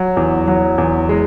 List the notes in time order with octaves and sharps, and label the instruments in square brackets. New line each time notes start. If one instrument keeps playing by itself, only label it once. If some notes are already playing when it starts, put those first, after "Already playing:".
Already playing: [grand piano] F#3
E2
F#3
E2
G#3